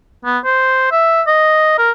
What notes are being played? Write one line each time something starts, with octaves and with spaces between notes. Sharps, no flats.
B3
C5
E5
D#5
A#4